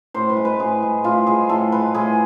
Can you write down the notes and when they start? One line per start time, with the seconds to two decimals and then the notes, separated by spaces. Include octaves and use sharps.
0.14 A2 C5
0.30 B4
0.37 G#3
0.45 B4
0.59 A2 G#4
0.82 G#3
1.04 A2 F4
1.27 G#3 G#4
1.49 A2 A4
1.72 G#3 B4
1.95 A2 G#4